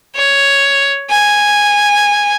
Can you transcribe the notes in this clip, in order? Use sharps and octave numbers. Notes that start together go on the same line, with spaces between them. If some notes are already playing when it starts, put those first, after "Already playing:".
C#5
G#5